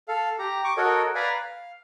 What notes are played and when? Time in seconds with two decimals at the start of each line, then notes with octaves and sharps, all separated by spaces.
0.08 A4 F5
0.39 G4 A#5
0.64 C#6 D6
0.77 F#4 A4 A#4 C#5 D#5
1.15 B4 D5 F5 G#5 A#5
1.34 F5